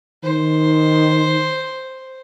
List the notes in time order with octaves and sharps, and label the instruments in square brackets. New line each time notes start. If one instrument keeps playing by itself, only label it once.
[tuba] D#3 [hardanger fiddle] C5